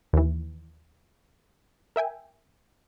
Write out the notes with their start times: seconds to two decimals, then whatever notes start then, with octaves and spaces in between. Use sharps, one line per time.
0.13 D#2 E3
1.96 A#4 E5 G5 G#5